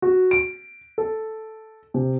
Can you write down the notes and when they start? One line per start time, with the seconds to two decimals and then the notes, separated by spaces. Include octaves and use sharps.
0.02 F#4
0.31 D7
0.98 A4
1.94 C3